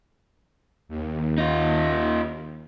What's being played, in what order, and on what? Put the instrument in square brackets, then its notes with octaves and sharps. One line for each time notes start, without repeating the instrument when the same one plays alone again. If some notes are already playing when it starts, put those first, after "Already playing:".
[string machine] D#2
[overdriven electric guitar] D#4 F4